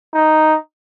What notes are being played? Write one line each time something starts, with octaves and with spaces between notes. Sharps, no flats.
D#4